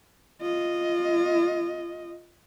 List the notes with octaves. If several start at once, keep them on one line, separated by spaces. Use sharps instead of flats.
F4 D#5